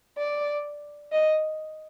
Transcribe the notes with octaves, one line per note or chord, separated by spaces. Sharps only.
D5
D#5